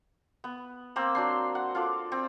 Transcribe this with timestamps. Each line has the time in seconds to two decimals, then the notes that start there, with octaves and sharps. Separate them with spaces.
0.44 B3
0.96 A#3 C4 E6
1.15 F#3 D4 C6
1.55 F#5
1.75 F4 A4 D5
2.12 C4